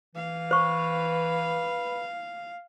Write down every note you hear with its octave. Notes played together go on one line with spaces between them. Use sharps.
E3 F5
B4 C5 C#6